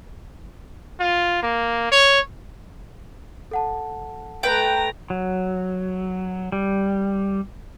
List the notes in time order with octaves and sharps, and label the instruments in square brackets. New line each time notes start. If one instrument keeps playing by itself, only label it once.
[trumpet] F4
A#3
C#5
[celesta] A4 F#5 A5
[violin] A3 A#5 [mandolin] B4 G5
[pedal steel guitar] F#3
G3